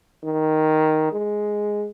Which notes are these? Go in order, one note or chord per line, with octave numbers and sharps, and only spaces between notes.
D#3
G#3